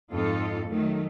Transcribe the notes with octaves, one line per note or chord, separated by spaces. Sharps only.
F2 G#2 D#4 F4 A4
D#3 F#3 A3